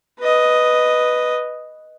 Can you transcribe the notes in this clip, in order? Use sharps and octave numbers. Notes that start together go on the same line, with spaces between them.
B4 D#5